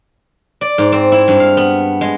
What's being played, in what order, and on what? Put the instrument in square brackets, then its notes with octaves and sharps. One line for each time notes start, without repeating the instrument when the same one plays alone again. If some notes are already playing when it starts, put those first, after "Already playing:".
[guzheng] D5
G#2
C4
E4
G2
F5
B3
G#3